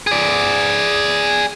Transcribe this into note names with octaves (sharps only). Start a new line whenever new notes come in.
G#4 D5